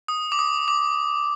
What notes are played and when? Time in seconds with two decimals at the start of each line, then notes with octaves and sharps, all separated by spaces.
0.08 D#6
0.32 D6
0.39 D#6
0.68 D6